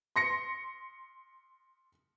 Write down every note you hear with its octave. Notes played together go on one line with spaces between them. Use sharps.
C6 A#6 C#7